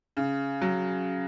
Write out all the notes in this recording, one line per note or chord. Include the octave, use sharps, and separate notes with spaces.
C#3
F#3